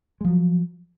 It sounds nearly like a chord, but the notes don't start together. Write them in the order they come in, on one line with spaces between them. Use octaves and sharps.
G#3 F3 F#3